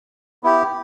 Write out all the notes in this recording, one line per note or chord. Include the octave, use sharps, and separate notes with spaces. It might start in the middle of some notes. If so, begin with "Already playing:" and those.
B3 E4 G4